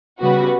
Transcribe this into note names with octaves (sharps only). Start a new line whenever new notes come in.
C#3 G3 B3 F#4 B4